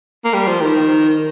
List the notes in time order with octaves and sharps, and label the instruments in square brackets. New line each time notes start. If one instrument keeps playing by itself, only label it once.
[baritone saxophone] A#3
G3
F3
D#3